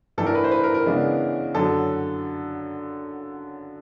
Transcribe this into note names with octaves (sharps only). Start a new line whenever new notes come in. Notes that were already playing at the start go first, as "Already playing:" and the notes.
A2 E3 A3 D4 A4
A#4
B4
C5
B4
A#4
A#4
C#3 E3 G#3 B3 D4
F#2 D3 F#3 A4